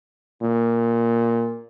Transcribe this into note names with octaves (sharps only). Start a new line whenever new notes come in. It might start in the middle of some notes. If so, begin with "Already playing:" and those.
A#2